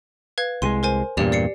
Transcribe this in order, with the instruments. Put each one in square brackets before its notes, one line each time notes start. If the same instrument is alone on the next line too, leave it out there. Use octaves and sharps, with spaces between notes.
[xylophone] B4 F5 G#6
[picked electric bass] C2 G3 G#3 [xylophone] C6 D#7
[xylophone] A#4 C5 G#5
[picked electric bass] E2 G2 A#2 [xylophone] G4 D5 F7
[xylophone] D5 C7 C#7